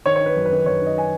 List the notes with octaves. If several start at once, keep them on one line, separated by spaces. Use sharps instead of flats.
D#3 C#5
C#5
D#4
B4
F#2
B4
D#3
F#2 C#5
D#4 D#5
D#4 G#5